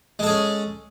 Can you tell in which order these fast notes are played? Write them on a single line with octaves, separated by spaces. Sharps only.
G#3 A4 G#4 C#4